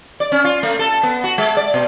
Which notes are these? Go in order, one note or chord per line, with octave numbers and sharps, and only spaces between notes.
D5
C#4
F4
A3
A4
B3
F#4
G#3
D5
B2